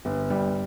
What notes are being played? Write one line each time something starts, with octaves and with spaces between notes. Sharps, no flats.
G1
G3